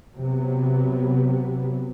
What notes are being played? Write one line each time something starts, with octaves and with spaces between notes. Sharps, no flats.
C3 F#3 B3